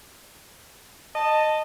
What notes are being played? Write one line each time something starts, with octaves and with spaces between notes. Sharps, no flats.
D#5 A5